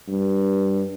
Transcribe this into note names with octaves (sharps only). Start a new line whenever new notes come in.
G2